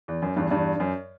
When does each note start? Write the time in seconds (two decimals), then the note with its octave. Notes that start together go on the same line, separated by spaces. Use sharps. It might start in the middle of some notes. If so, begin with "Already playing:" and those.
0.08 E2
0.22 F#2
0.36 E2 G2
0.51 E2 G2
0.80 F#2